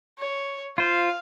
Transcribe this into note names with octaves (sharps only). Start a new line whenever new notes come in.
C#5
F4 C5 F5